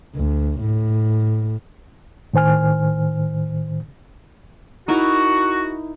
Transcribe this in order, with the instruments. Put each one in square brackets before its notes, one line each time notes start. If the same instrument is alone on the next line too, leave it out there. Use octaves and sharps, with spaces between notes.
[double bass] D2
A2
[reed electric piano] A2 D#3 C5 G#5 F6
[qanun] D#4 E4 A#4 [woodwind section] F#4